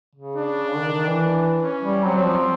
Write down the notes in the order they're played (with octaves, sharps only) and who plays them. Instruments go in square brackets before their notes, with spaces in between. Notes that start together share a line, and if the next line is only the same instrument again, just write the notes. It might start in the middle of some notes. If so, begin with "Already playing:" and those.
[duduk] C#3
[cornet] D4
[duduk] D#3
D#3
E3
[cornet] C#4
[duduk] G3
[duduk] F#3 [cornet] C4
[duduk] F#3
F3